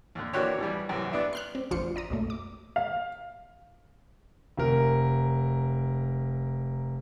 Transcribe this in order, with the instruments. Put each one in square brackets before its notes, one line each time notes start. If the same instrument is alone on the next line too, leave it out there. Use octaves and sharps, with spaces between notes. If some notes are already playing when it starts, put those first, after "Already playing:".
[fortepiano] D#2 D3
E3 A#3 D4 F#4 G4 C#5
B2 E3 G3
F#2 C3 E3
B3 D4 E4
[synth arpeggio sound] C6 F6 F#6
C4
A1 F2 D4 F4 C5 C#7
D5 A#5 D#6
B1 F#2 A3
D6
[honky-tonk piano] F5
[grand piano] F1 A#4